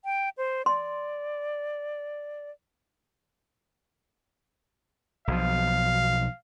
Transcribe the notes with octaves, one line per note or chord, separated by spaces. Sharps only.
G5
C5
D5 C6
B1 B2 F3 F5